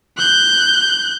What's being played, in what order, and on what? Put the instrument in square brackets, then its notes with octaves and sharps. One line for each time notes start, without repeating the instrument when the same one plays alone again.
[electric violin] F#6 G6